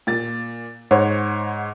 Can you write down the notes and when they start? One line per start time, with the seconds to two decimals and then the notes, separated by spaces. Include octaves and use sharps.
0.07 A#2 A6
0.91 G#2 C5 C#5 F#5